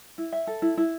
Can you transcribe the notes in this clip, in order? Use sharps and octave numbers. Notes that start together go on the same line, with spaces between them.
E4
E5
A4
E4
E4